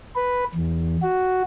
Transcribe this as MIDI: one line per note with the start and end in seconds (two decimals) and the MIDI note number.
0.16 0.44 71
0.55 0.96 40
1.02 1.43 66